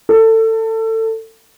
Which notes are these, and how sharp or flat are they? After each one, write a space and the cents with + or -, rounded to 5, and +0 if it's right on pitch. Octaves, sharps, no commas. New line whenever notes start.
A4 +25